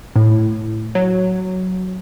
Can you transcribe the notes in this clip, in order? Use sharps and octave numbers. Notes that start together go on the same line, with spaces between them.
A2
F#3